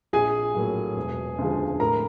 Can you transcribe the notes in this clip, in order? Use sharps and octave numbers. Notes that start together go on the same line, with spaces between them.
A#1 G#4 G#5
A2 F#3 A#3
E1
D2 C#3 F3 G#3
A2 A#4 A#5